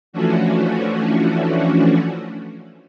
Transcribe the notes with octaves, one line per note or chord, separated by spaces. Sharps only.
E3 F3 A3 C#4 D4 F#4